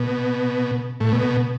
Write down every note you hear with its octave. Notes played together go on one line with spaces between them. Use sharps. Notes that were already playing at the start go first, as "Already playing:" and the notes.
Already playing: B2
A2
B2